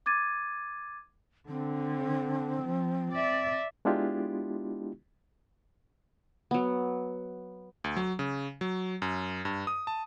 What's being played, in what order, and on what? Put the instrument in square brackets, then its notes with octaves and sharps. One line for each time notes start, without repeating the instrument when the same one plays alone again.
[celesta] D6 G#6 A6 D#7
[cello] D3 [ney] C4
[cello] F3
D5 E5
[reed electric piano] G#3 B3 D4 E4 F4 G4
[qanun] F#3 B3
[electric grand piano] D2
F#3
C#3
F#3
F#2
G2
D#6
A5